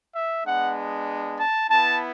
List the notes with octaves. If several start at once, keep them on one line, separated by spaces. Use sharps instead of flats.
E5
G#3 B3 D4 F#5
A5
B3 E4 A5